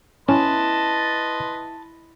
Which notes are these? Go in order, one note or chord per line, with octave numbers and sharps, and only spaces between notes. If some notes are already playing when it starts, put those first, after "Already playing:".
C#4 E4 B4 D#5 A5 C6